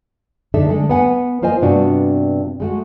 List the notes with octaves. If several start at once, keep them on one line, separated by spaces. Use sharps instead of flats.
D3 D#4 A4 E5
D3 G#3 A4
B3 F#5 G#5
A#3 F4 C5 D#5 G#5
G2 C3 B3 D4 F4 F#4
G#3 A3 F#4